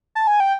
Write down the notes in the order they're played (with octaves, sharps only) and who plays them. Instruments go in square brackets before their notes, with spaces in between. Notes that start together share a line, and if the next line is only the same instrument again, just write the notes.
[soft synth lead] A5
G#5
G5